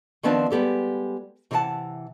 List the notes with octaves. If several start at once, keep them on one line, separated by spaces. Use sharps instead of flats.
D#3 F3 B3 C4 D4 A5
G3 G#3 B3 G4 A4
C3 E3 A#4 B4 F#5 A5